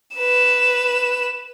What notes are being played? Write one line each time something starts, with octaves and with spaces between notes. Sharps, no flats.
B4 E7